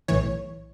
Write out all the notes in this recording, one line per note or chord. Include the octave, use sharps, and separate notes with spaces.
B1 A2 E3 C#5